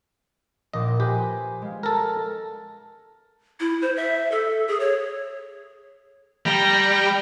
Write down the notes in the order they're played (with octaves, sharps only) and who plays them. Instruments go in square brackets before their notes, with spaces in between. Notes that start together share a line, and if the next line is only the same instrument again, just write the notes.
[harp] A#1 A#2 D6 [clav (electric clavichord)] D#5
[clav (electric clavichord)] G4 [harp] B4 C5 G#5
[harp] G#3 F5
[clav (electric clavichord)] A4 A#4
[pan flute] E4
C5
E5
A4
G#4
C#5
[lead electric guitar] G3 [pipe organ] G5 A#5